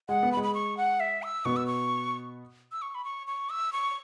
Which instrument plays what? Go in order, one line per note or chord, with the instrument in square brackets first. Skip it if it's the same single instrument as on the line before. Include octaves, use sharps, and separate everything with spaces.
[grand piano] G#3 [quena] F#5
[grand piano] B3
[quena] B5
[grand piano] G#3
[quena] B5
C#6
F#5
E5
E6
[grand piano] B2 B3 [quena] C#6
[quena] E6
C#6
E6
C#6
B5
C#6
C#6
E6
C#6